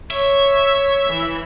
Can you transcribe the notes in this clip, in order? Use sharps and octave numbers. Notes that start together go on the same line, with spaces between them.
C#5 E5
E3